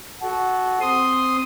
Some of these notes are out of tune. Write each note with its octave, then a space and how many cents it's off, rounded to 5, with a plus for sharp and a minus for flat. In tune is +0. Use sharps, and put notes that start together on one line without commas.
F#4 +0 A4 -25
C4 -10 C6 +0 D#6 +0